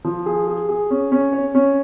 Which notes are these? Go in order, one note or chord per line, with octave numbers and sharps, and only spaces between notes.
F3
G#4
G#4
G#4
C#4
C#4
C#5
C#4